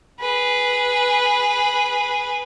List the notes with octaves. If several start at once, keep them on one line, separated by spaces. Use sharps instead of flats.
G#4 B4